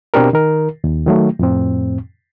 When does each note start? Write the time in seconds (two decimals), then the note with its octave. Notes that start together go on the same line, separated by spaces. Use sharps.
0.14 B2 C4 D4 G4 A#4
0.33 D#3 A#4
0.84 D#2
1.06 D#3 F#3 A3
1.39 F2 A2 C4